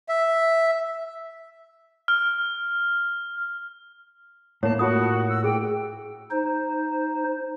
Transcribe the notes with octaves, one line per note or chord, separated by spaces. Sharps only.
E5
F6
A2 A#3 C#5 A5
F4 F#4 D#6
E6
G#4 G5
D#4 C5